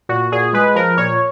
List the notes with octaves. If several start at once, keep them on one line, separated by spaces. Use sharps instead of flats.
A#2 F#4
A#2 G#4
G#3 B4
F3 A#4
A#2 C#5